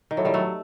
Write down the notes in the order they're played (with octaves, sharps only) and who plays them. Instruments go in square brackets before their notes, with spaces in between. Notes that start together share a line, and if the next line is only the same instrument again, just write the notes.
[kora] D#3
[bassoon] A2 [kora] F#3
[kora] D#3 G3
F#3 A3